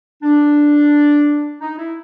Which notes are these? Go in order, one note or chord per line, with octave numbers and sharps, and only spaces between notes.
D4
D#4
E4